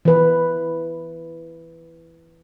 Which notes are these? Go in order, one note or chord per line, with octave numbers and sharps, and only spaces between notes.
E3 B4